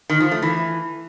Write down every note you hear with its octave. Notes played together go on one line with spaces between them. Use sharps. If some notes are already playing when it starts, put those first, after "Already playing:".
D#3
F3
A3
E3